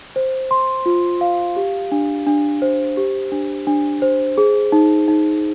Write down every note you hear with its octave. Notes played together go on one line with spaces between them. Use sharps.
C5
C6
F4
F5
G4
D4
D4
C5
G4
D4
D4
C5
G#4
D#4
D#4